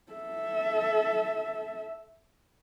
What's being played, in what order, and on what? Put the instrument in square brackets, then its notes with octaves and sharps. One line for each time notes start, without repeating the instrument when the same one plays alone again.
[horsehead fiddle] A4 E5